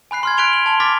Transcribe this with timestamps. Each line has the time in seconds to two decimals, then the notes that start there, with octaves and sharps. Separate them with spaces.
0.11 G#5 B5 F#6 C7
0.23 C6 F6 G#6
0.38 F#6 B6 D7 F7 G7
0.53 F#7
0.66 A5 C6 F7 G7
0.80 D6 F6 A6 B6